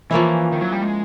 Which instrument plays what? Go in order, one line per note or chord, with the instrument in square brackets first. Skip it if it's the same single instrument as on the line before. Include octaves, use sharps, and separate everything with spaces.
[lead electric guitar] E3 [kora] F3 A#3 C#4 E4
[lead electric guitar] D#3
F#3
G3
G#3